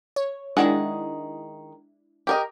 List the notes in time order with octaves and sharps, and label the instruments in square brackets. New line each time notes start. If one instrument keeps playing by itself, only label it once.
[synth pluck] C#5
[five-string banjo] D#3 G#4 F#5 [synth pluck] G#3 D4 E4
[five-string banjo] G4 A#4 D#5